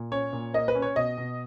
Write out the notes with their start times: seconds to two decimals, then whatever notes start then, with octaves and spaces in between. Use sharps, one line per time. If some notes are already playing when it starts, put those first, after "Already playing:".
Already playing: A#2
0.12 C#4 C#5
0.33 A#2
0.54 A#3 D#5
0.68 B4
0.75 C#4
0.82 C#5
0.96 B2 D#5
1.17 B2